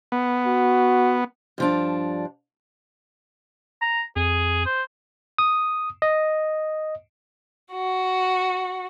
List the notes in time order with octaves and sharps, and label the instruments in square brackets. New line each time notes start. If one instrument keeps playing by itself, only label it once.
[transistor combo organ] B3
[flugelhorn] F#4
[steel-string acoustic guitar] G2 F3 D4
[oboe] A#5
[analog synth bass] F2 [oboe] G#4
[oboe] C5
[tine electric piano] D#6
D#5
[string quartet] F#4